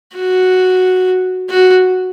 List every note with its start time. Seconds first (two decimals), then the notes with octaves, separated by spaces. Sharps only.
0.16 F#4
1.50 F#4